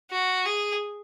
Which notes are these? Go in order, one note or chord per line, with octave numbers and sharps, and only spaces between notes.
F#4
G#4